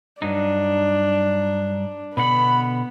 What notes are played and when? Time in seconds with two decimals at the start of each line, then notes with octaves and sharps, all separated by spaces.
0.22 G2 F#3 D4 D#4
2.17 B2 D3 B3 F#5 B5